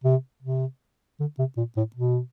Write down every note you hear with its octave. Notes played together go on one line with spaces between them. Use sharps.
C3
C3
D3
C3
A#2
A2
B2